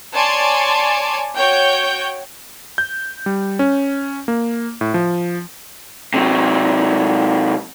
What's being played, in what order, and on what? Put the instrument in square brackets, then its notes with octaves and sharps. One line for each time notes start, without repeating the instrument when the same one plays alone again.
[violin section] C#5 D5 G#5 A5 C6
F#4 C#5 G5 G6
[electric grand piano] G6
G3
C#4
A#3
A2
F3
[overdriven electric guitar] C3 F#3